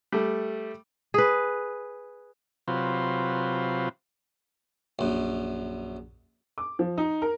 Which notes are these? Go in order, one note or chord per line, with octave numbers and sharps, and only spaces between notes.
G3 A3
G#4 B4
C3 F#3 F4 B4 C5
A#1 F#2
D6
F3
D#4
A#4